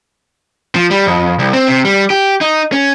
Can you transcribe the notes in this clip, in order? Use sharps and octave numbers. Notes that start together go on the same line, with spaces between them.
F3
G3
F2
C2
C4
C3
G3
G4
D#4
C#4